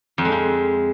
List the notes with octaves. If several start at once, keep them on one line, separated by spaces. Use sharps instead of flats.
F2
G#3
F2